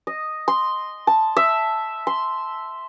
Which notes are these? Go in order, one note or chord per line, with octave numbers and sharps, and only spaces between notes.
D#5
C6
A5
E5
C6